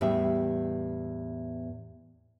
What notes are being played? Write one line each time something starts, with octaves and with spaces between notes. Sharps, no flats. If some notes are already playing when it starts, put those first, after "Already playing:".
E2 A2 G3 B3 E5 G5